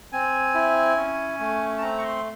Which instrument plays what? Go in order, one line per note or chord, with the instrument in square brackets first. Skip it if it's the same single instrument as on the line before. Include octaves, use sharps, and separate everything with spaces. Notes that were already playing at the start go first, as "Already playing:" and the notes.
[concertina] C4 G#5
E4
C#4
A3
A5
C4 A#5
C#6
C6